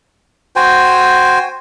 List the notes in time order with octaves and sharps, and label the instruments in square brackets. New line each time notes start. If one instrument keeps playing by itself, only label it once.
[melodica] F#4 C5 G5 G#5